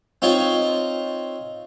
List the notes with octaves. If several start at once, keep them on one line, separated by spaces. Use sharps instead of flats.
C4 D#4 F4 C#5